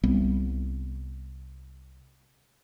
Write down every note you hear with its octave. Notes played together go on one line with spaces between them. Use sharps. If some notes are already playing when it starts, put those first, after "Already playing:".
C2 G3 B3